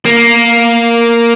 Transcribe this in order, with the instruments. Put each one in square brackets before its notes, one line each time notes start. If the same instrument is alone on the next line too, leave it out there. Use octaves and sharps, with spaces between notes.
[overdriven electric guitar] A#3